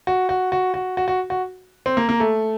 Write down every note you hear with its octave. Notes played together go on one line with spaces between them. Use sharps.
F#4
F#4
F#4
F#4
F#4
F#4
F#4
C4
A#3
A#3
A3